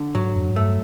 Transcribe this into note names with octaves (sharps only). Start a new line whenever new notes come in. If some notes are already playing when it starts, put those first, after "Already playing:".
Already playing: D3
G#2 F#3
F2
G#2
G2 A3